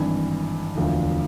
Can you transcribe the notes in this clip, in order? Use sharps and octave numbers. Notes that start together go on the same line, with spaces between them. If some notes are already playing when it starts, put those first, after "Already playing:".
Already playing: G#1 G2 E3
E1 D2 D3 F3